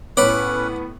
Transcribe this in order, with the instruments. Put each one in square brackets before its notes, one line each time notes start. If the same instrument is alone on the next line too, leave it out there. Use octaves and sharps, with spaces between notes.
[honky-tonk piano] A2 B3 [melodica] C#4 B4 [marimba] C#5 [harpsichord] F#5 B5 D6